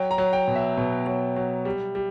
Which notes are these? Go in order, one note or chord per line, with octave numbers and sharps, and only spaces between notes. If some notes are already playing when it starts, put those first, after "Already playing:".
Already playing: F#3 G5
A#5
F#3
G5
B2
E5
B2
F#3
F#3
G3
G3